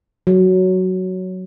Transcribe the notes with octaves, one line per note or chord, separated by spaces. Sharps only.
F#3